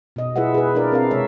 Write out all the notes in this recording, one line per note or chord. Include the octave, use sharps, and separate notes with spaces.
B2 D#5
E4 F4 G#4 B4 E5 F#5
G#4 B4
D4 E4 G#4 A#4 D5
C4 A#4 F5
C3 G#3 C#5 E5